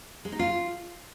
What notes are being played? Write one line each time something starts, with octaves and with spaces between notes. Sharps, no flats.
G#3
D#4
F4